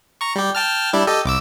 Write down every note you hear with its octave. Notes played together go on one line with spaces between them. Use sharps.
A#5 C#6
G3 G4
G5 A5 F6
G3 D4 E4
G4 A4 D#5
C2 D6 E6